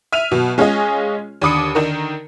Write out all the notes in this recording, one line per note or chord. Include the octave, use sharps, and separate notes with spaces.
E5 F6 D#7 F7
B2 F#3
G#3 C#4 F4 G#4 D#5
D#2 D3 B5 D6 D#6 C#7
D3 D#3 D#4 A#4